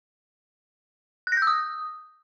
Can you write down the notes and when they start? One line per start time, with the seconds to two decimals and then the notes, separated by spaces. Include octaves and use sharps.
1.27 F#6
1.32 A#6
1.37 G6
1.42 E6
1.47 D#6